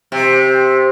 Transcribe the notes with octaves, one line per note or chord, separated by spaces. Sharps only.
C3